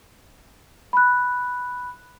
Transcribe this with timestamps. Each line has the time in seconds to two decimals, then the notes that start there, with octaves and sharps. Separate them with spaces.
0.93 B5 F#6